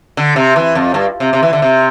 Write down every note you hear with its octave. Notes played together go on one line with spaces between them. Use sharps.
D3
C3
E3
F2
G2
C3
C3
E3
D3
C3